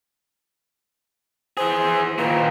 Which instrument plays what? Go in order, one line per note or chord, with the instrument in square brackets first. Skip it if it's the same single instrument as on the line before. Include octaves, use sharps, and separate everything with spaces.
[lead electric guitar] E3 G#4 [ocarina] C5
[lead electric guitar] D#2 A#2 [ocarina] B4